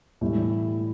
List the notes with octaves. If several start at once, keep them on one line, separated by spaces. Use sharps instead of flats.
A2 E3 G3